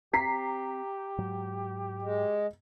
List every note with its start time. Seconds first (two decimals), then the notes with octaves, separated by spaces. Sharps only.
0.13 C4 G4 A#5 B6 C7
1.18 G#2 F#3
2.02 G#3